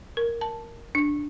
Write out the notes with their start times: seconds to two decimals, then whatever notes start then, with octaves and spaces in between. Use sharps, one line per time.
0.17 A#4
0.41 A5
0.95 D4